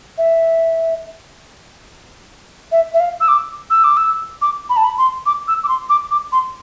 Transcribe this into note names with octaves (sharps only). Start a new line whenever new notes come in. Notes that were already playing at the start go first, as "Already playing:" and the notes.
E5
E5
E5
F5
E6
D6
E6
D6
E6
D6
B5
A5
B5
C6
D6
E6
D6
C6
D6
D6
C6